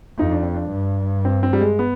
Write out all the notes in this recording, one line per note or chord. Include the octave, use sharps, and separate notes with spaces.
F2 D#4
D4
C4
D4
G2
C4
C4
G3
G#3
B3